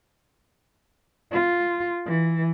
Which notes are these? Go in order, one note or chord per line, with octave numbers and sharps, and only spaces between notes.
F4
E3